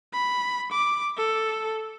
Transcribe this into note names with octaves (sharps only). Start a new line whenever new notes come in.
B5
D6
A4